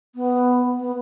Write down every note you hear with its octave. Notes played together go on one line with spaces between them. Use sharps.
B3
B3